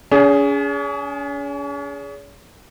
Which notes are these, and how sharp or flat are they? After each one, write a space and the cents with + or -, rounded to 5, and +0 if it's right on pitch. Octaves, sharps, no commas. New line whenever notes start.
C#4 +40 G#4 +0